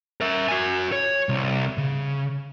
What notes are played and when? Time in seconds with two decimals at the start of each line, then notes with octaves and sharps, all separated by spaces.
0.21 A#4 E5
0.49 F#4 G#5
0.92 C#5
1.29 C2
1.78 C#3